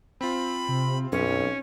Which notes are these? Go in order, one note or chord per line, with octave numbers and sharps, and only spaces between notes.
C4 F4 B5
C3
B1 F#2 C#4